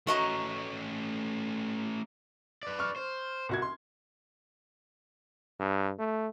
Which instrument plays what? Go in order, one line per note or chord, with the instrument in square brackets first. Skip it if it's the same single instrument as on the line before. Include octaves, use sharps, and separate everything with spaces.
[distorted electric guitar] A3 C#4 [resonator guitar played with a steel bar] F#4 D#5 A#5
[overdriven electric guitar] B4 D5
[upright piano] C#6 F6
[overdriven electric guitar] C5
[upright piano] C2 F#4 G#6
C6
[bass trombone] G2
A3